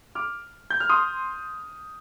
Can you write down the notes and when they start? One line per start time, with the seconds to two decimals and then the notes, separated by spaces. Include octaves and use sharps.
0.15 D6 F6
0.70 G6
0.80 F6
0.90 C6 D#6